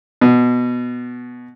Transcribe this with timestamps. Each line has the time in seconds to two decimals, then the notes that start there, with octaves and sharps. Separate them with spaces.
0.21 B2